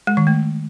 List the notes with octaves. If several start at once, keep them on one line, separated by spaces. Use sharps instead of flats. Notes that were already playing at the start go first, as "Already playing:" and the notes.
G#3
D#3
A3